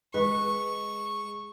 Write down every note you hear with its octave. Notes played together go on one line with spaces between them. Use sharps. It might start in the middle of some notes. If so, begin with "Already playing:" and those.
G#3 B4 C#6